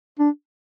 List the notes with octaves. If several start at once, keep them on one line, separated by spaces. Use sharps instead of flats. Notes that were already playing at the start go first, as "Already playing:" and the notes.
D4